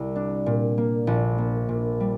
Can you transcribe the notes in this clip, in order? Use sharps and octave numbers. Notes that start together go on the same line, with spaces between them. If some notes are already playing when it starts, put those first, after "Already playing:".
Already playing: C2
D4
A#2
A#3
A#1
A#3
A#2
G3